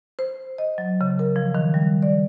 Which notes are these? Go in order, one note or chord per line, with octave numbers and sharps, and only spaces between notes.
C5
D#5
F#3
C#3
A#4
F3
D#3
G3
D5